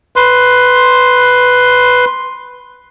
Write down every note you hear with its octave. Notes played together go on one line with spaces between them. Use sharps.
B4 C6